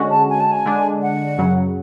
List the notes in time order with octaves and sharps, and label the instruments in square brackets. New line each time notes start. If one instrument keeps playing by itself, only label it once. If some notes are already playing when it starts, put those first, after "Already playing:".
Already playing: [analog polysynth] D3 G#3 C#4 F#4
[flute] A5
G#5
A5
G#5
[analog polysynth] D3 G#3 D4
[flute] F#5
[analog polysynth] F#2 C#3 F#3